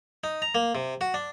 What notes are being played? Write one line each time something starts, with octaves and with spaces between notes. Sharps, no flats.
D#4
A#5
A#3
C3
F#4
D4